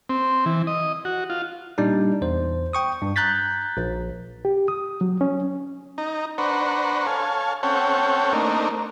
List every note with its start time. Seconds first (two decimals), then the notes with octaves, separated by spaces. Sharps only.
0.10 C4
0.46 E3
0.67 D#5
1.05 F#4
1.30 F4
1.78 A#2 G3 D4 D#4
2.21 E2 C5
2.73 G5 C#6 D#6
3.02 G2
3.16 A#5 F#6 G6 A6 B6
3.77 A#1
4.45 G4
4.68 D#6
5.01 F#3
5.21 C#4
5.98 D#4 A#5
6.38 D4 B4 C5 F#5 A#5 C#6
7.07 A4 C#5 F5 G#5
7.63 C4 C#4 A4 C#5 F#5 G5
8.33 A3 A#3 C4 D4 D#4 A#4